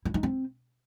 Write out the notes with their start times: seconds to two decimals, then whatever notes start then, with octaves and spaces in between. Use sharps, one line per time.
0.05 E4
0.14 D#4
0.23 C4